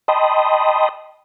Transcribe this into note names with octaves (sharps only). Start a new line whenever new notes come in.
D#5 G5 A5 B5 C6 D#6